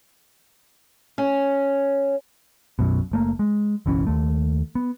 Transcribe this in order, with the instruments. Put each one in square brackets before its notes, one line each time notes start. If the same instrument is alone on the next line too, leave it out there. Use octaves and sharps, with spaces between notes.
[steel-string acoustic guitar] C#4
[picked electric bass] B1 F#2 B2
F#1 A3 A#3
G#3
F#1 B1 E3 C#4
D#2 A3
B3